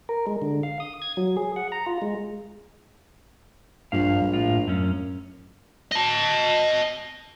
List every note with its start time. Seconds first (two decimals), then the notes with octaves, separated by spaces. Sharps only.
0.09 A#4
0.27 G#3
0.42 D3
0.63 F5
0.80 D#6
1.02 G#6
1.17 F#3
1.37 G#4
1.56 F#5
1.72 A#5
1.86 F4
2.02 G#3
3.92 A#1 G2 F5
4.33 A2 F4
4.68 F#2 C#4
5.92 D#5 A5